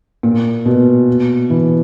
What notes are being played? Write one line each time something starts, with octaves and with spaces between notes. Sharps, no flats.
A#2
B2
E3